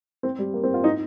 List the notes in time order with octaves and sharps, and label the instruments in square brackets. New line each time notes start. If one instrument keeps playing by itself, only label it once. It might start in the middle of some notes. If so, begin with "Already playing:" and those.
[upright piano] C4
G3
A#3
C4
F4
D#4